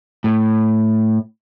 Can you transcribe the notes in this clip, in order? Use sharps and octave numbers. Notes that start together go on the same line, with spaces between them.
A2